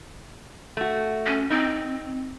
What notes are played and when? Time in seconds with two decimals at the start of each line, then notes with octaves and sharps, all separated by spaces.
0.77 A3 F#4
1.26 C#4
1.50 C4 D#4